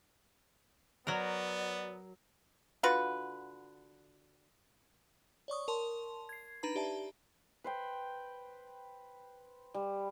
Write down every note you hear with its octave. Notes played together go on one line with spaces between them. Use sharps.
F#3 B3 A#4 D5
D3 F4 F#4 B4
C#5 D5 C#6 D#6
A#4 A5 C6
G#6 C7
D4 D#4 B4 A#5 B5
G4 D5 E5 A5
B4 C5 G5
G3